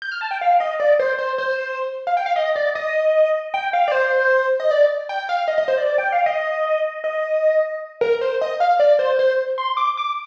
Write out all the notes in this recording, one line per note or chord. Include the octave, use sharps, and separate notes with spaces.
G6
F6
A5
G5
F5
D#5
D5
C5
C5
C5
F5
G5
F5
D#5
D5
D#5
G5
F5
D5
C5
D#5
D5
G5
F5
D#5
D#5
C5
D5
G5
F5
D#5
D#5
A#4
C5
D#5
F5
D5
C5
C5
C6
D6
D6